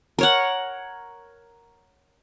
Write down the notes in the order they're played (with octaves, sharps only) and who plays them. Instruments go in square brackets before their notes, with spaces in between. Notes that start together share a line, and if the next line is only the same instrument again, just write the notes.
[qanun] A#4 C#5 F#5